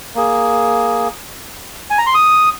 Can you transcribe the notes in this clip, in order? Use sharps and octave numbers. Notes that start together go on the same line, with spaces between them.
A#3 G#4
G#5
A#5
C6
D#6